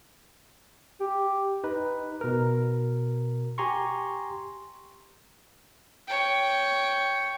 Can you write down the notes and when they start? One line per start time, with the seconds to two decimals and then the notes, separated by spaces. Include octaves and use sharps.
1.00 G4
1.64 D#4 B4
2.21 B2 A#4
3.58 G4 G#5 A#5 C6 C#6
6.08 C#5 G5